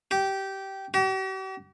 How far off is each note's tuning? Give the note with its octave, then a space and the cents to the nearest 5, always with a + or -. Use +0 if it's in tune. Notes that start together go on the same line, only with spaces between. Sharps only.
G4 -15
G4 -45